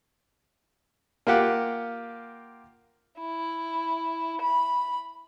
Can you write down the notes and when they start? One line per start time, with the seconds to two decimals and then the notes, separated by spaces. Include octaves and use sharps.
1.27 A#3 F4 G4 F#5
3.19 E4
4.42 B5